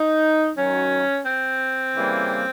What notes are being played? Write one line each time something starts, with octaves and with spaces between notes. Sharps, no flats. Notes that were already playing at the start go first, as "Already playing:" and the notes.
Already playing: D#4
F#2 D#3 F#3 C#4
C4
C#3 E3 G3 A#3